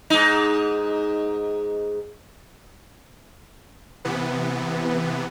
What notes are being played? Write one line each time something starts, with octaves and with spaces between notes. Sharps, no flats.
G#2 D#4
C3 E3 B3